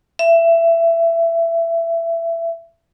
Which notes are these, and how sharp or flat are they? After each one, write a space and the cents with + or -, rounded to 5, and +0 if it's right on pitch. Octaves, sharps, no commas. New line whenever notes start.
E5 +20